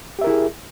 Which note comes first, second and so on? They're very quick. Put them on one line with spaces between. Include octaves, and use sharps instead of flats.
G4 E5 A#4 E4 G#4